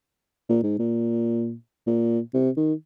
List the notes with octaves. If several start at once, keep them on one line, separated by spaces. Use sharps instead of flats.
A#2
G#2
A#2
A#2
C3
D#3